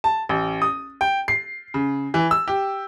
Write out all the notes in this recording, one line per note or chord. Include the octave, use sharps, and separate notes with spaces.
A5
A1
D#6
G5
C7
C#3
E3
E6
G4